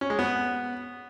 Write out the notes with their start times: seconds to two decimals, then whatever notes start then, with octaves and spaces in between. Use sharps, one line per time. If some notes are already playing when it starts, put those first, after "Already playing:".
0.01 C#4
0.10 G#3
0.19 B3